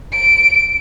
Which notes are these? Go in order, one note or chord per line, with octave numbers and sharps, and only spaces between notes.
D7